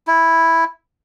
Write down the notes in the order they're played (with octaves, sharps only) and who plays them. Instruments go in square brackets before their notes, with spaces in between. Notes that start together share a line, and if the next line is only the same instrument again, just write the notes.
[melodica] E4